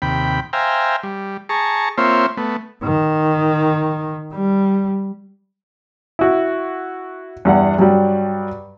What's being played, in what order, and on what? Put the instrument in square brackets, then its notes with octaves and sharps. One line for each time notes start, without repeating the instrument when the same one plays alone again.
[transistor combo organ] D#2 C3 G5 B5
C5 E5 F5 G5 G#5 A#5
G3
G#4 A5 A#5 C#6
A#3 C4 F4 C5 C#5 E5
A3 B3
[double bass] D#3
G3
[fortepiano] E4 F#4
E2 G2 F#5
G2 F#3 G3